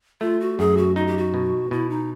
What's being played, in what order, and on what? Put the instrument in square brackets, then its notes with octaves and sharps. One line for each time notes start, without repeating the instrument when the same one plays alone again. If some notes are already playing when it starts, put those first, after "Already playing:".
[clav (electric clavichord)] A3 [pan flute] F4
[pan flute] F#4
[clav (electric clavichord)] F#2 [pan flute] G#4
[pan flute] F#4
[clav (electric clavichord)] D#4 [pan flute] F#4
[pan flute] G4
F#4
[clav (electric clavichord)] B2
[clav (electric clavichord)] B2 [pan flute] E4
[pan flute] D#4